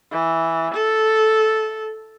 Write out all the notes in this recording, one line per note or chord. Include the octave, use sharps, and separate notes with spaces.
E3
A4